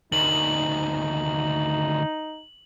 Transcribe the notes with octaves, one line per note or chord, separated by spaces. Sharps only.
D2 D#3 D#4 F#7